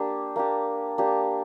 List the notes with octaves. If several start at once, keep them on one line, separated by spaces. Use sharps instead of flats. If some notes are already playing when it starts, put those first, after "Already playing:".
Already playing: A#3 D4 G4
A#3 D4 G4
A#3 D4 G4